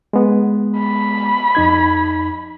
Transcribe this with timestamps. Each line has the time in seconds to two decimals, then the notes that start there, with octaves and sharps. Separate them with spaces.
0.13 G#3 B3
0.79 B5
1.55 F2 D#4 G#6